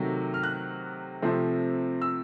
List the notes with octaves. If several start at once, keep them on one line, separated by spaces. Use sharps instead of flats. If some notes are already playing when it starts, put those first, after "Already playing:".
Already playing: C3 D#3 F#3 A3
F6
F#6
C3 F3 A3 C4
E6